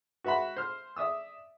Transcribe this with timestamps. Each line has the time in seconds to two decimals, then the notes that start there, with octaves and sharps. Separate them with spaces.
0.24 F#4 B4 E5 F#5 B5
0.56 C5 F6
0.96 D5 E5 D#6 E6